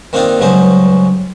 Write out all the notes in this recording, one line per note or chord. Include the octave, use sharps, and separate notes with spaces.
D#3 A#3 C4 D4 D#4 F4
C#2 G2 F#3 C#4 D#4 C5